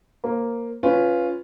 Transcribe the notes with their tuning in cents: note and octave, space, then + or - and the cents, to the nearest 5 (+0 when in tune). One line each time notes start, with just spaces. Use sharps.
A#3 +0 C5 +15
C#4 +0 F4 +0 B4 +10